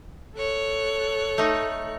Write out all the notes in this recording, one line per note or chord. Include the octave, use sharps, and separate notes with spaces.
A4 C#5 F#6
A3 D#4